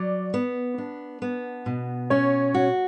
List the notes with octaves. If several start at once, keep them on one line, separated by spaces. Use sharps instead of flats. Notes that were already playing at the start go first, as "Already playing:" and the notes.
Already playing: F#3 D5
B3
D4
B3
B2
C#4 C#5
F#4